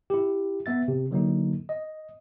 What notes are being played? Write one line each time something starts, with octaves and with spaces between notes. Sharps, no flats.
E4 G4
B3 E5 A6
C3
D3 F#3 A#3 D#4
D#5